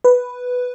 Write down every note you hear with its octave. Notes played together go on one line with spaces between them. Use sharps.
B4